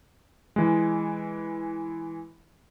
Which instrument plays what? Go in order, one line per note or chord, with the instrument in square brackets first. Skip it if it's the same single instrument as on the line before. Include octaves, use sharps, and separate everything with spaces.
[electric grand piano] E3 G#3